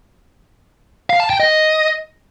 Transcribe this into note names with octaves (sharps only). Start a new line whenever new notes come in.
F5
A5
G5
D#5